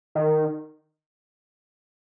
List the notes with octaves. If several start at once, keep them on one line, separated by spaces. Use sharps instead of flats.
D#3